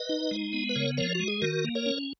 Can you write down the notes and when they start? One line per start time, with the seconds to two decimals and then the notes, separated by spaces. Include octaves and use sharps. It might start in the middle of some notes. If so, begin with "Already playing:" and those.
Already playing: B4 D#5
0.09 D#4
0.31 G#3
0.53 B3
0.69 B4
0.76 C#3 A#4 C#5
0.97 F3 A#4 C#5
1.15 G#3 F#4
1.28 G#4
1.42 D#3 F#4 A#4
1.64 A#3
1.75 A#4 C#5
1.86 C#4